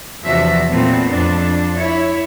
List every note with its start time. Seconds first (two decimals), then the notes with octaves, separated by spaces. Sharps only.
0.24 E2 C3 F3 D4 F#4 E5
0.68 A#2 F#3 A3 B3 C4
1.11 F2 D4
1.76 E4 C#5